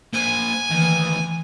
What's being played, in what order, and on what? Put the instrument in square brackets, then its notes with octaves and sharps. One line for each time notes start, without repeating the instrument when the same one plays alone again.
[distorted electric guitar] A#3 C5 [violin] G#5
[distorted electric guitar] D2 D#3 [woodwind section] E3